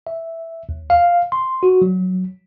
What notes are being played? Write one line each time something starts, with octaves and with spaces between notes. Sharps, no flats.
E5
D#2
F5
C6
F#4
F#3